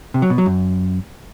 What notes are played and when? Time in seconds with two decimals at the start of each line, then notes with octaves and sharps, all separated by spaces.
0.14 C3
0.22 F#3
0.30 B2
0.38 F#3
0.46 F#2